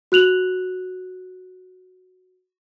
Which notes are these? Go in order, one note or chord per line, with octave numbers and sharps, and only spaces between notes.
F#4 F#6 F7 F#7